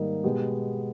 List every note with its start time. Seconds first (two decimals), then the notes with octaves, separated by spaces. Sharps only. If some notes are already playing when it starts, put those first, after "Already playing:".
Already playing: G#2 D#3 G3 A#3 D#4
0.24 B2 G#3 B3 G4